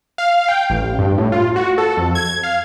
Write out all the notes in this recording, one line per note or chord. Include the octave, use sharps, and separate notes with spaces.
F5
G5
A1
G2
A2
F4
F#4
A4
F2
G#6
F5